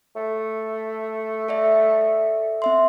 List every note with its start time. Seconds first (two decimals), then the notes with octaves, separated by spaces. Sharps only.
0.16 A3
1.48 A4 D5 E5
2.62 C4 E5 C6